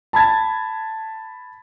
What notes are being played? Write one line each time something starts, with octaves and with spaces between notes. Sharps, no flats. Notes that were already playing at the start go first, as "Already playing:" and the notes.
A5 B5 G#6 A6